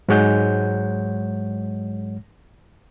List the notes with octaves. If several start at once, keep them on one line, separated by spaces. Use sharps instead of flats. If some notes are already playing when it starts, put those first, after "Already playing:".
G#2 F#3 G#3 C#5 F#5 G6